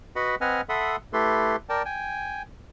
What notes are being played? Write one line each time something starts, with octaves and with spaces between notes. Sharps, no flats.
F#4 B4 D#5 F#5 B5
C4 B4 D#5 F#5 G#5 F6
A4 E5 F#5 B5 C6 D#6
A3 E4 G4 A4 B4 C6
A#4 D5 G5 A5
G5 G#5